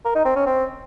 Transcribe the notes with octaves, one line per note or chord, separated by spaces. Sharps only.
A#4
D#4
C4
C#4
C4